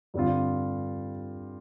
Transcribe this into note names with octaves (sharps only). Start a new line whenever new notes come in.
G2 D3 G3 C4 F4